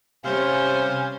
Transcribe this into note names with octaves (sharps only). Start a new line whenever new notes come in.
C3 G3 C#4 C5 F5 G#5